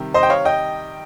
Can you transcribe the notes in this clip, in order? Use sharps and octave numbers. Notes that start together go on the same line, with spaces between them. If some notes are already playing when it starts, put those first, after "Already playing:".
Already playing: C3 D#3 G3
C5 D#5
G5
C#5 F5
D#5 G5